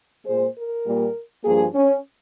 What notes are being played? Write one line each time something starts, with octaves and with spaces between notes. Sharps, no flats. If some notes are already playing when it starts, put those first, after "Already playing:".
A#2 G#3 C5
A#4
A#2 G3 A#3
G2 F3 A#3 G#4
C#4